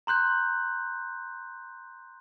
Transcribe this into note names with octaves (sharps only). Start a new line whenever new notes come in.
A#5 C6 F#6 G6